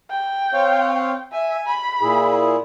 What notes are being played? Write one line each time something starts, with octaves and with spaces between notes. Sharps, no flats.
G5
C4 C#5 F5
E5 G#5
B5
A#2 E4 G#4